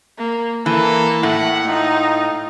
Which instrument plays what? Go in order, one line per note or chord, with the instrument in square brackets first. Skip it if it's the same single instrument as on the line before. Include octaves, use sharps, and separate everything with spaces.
[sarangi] A#3
[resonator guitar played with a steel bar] E3 [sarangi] A#3 [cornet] A4
[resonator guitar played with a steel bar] A2 [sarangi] A3 [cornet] F#5
[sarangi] D#4 [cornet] F4